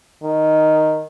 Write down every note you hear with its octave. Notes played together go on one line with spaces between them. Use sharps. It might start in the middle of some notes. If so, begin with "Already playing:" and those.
D#3